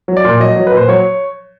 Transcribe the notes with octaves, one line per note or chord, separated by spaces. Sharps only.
F#3
D5
A#2
F#3 D#5
F#3
B4
A#2 C5
F#3 C#5